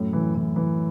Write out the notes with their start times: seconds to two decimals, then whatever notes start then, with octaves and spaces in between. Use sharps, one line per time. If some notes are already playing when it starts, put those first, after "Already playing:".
Already playing: F#2 A2
0.13 E3
0.35 E3
0.56 E3